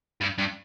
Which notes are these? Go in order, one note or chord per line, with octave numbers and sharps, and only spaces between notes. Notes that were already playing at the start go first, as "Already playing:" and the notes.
G2
G2